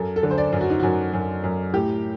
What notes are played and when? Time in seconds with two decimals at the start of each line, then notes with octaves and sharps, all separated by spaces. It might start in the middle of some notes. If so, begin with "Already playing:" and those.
Already playing: F#2 A4
0.16 A4
0.23 D3
0.31 C5
0.38 D5
0.53 F#2
0.61 F#4
0.70 D#4
0.80 F#2 F#4
1.13 F#2
1.44 F#2
1.73 A2 G4